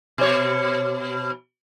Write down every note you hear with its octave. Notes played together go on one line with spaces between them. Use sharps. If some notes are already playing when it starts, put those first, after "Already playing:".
B2 C#5